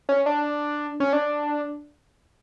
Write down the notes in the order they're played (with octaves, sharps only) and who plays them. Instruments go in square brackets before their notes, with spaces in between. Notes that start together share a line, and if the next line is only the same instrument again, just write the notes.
[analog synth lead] C#4
D4
C#4
D4